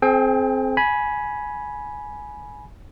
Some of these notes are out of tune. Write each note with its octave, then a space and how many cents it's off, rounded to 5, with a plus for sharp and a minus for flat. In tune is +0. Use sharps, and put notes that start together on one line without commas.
C4 +0 G#4 +40 G5 +30
G#5 +10 B5 -15